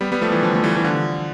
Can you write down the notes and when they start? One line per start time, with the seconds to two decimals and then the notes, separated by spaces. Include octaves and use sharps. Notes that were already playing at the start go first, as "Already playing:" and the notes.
0.01 G3 B3
0.12 G3 B3
0.21 F3 A3
0.32 E3
0.42 D3 F3
0.55 A3
0.63 E3 G3
0.76 E3
0.84 D3 F3